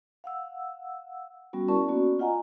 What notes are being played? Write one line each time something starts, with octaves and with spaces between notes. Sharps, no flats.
F5 F#5 E6
G3 B3 C#4 F#4
C#4 E4 A#4 D5 A5 C#6
A#3 B3 C#4 F#4 D5
F4 D#5 F#5 G#5 A#5